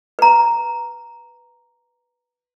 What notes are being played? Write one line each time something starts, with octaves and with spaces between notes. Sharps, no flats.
B4 A#5